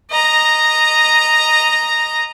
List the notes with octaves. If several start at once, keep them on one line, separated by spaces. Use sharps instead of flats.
D#5 A#5